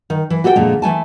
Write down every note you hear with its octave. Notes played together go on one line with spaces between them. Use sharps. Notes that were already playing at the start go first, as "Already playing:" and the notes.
D#3
E3
F#4 G4 A4 D5 G5
F2 A#2 D3 G#3
E3 A3 G#5 A5